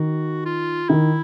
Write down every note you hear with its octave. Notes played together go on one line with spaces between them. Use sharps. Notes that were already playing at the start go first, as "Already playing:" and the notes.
Already playing: D#3 F#4
F4
D#3 E4